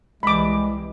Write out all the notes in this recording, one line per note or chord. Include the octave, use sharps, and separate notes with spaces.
C2 E3 G3 G#3 B5 D6